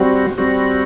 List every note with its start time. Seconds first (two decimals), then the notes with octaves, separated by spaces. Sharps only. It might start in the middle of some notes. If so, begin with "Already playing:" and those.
Already playing: G3 C4 F#4
0.38 G3 C4 F#4